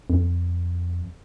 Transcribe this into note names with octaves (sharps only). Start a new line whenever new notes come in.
F2